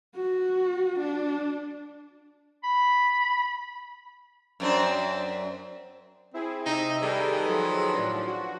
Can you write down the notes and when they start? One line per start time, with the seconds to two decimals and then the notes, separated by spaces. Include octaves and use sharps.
0.15 F#4
0.99 D4
2.63 B5
4.60 F#2 C4 D4
6.34 C4 E4 G#4
6.66 C3 D#4 D#5 E5
7.02 D#3 G3 G#4 A4 B4
7.48 F3 F#3
7.93 A2 D4
8.27 F#4